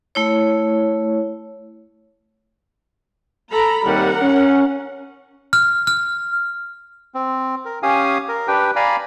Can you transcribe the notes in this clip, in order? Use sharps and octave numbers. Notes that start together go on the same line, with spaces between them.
A3 E4 C#5
A4 A#5 B5
D#2 C3 G3 A#4 F#5
C#4
F6
F6
C4
A#4
C#4 G4 F5 G#5 D#6
A#4
D4 G4 B4 G5
D5 F5 G#5 A#5 B5